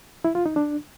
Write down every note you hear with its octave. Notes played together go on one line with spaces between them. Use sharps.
E4
F4
D#4
D4